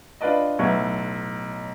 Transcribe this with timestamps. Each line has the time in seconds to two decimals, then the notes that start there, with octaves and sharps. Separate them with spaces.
0.21 D4 F4 B4 D5 D#5
0.59 B1 A2 B3 E5 C#6 G#6